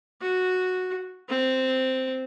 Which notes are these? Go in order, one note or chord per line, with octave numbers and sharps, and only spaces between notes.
F#4
C4